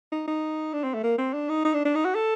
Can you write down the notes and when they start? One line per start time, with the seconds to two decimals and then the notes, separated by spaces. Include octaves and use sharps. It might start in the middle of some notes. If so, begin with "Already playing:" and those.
0.12 D#4
0.28 D#4
0.73 D4
0.84 C4
0.94 A3
1.03 A#3
1.18 C4
1.33 D4
1.49 D#4
1.65 D#4
1.74 D4
1.85 D4
1.95 D#4
2.05 F#4
2.15 A4